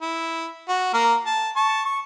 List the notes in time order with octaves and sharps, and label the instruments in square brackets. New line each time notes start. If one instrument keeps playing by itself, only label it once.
[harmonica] E4
F#4
A#3 A#4
A5
A5 C#6
C#6